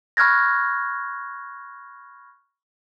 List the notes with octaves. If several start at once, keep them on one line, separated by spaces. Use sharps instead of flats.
B5 C#6 F6 F#6 G#6 A#6